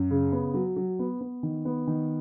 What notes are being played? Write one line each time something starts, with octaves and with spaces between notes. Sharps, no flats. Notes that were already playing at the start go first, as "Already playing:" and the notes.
Already playing: F#2
C#3
B3
F#3
F#3
B3
B3
D#3
B3
D#3